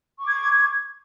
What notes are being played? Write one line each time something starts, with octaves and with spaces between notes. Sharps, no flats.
C#6 D6 G#6